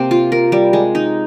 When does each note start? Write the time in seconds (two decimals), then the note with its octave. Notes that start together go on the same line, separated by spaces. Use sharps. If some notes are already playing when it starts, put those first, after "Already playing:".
Already playing: C3 A#3 C4
0.11 F4
0.32 A#4
0.52 G3
0.73 G#3
0.95 D#4